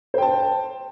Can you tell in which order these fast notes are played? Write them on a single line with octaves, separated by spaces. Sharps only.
C5 G5 A5